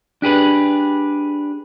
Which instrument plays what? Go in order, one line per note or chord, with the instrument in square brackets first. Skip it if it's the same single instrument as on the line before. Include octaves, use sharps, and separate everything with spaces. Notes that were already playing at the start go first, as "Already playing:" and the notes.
[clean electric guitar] D4 G4 G#4 B4